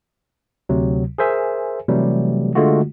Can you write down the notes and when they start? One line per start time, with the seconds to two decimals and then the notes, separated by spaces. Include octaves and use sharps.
0.69 D2 C3 F#3
1.18 G#4 A#4 C5 E5 G#5
1.88 C3 E3 F#3 G3 A3
2.55 D3 G#3 A3 F4 F#4